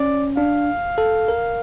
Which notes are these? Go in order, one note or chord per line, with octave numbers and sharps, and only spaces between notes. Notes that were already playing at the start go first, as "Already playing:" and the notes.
Already playing: C#4 D5
D4 F5
A4
A#4